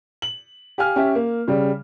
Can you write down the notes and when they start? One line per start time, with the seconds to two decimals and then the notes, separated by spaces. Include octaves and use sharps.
0.22 F#7
0.78 G4 F5 G#5 F6
0.96 C#4 G4 E5
1.15 A#3
1.48 C#3 G3